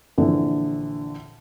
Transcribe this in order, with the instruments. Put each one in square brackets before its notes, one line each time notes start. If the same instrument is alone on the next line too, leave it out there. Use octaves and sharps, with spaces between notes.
[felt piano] A#1 D3 E3